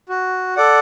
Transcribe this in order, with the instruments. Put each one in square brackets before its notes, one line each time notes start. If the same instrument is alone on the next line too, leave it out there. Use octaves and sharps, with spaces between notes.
[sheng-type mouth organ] F#4
A4 D5 F#5